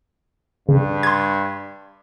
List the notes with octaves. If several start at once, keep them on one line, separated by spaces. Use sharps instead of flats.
G2 C#3
C6 G#6